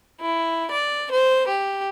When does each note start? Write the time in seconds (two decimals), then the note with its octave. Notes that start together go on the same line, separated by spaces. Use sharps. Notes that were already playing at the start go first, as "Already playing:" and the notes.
0.20 E4
0.72 D5
1.12 C5
1.49 G4